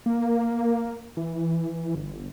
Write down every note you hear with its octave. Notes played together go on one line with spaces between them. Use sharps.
A#3
E3
G1